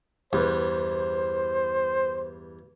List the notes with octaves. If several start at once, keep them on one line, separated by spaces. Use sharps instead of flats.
E2 G2 C5